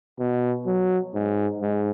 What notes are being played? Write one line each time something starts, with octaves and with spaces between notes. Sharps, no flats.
B2
F#3
G#2
G#2